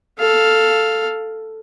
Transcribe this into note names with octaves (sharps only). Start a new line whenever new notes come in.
A4 F5